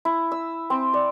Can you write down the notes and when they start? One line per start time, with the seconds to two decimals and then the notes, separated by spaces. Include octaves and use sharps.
0.05 E4
0.31 E6
0.70 C4
0.94 D5